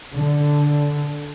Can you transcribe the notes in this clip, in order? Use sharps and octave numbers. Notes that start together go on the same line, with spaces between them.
D3